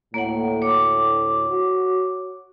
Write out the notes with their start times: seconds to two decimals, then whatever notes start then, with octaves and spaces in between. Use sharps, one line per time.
0.14 D2 A2 A#3 C#5 F#5
0.62 C#5 D6
1.49 F#4